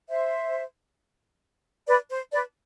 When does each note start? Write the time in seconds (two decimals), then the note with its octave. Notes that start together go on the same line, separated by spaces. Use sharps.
0.08 C5 E5
1.87 B4 D5
2.10 C5
2.32 B4 D5